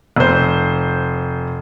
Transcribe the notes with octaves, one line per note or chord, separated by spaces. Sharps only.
F1 C5